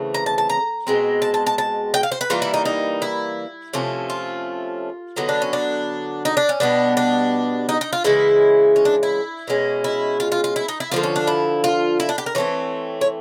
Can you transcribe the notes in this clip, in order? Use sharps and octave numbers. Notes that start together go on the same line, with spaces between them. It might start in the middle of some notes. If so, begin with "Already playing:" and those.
Already playing: C#3 E3 A3 C4
A#5
A5
A5
A#5
B2 G#3 C4
A5
A5
A5
A5
G5
F5
C5
B4
E3 G3 A#3 F4
E4
D#4
D#4
E4
C3 F3 A3 C#4
F4
D3 F#3 B3 D#4
D4
C#4
D4
D#4
D4
C#4
B2 G3 B3 D4
D4
D#4
D#4
F4
C#3 E3 G#3 E4
C#4
D4
E4
B2 G#3 C#4
E4
F4
F4
F4
E4
D#4
E4
D3 F3 A#3 F4
C#4
D4
E4
F4
E4
D4
G4
A#4
E3 A3 C4 C#5
C#5